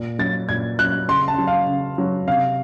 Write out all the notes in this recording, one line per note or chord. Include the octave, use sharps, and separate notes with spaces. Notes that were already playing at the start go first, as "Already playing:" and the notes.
Already playing: A#2
F#3 A6
A#2 G#6
F#3 F#6
C#3 C6
A5
F#3
F5
C#3
F#3
C3 F5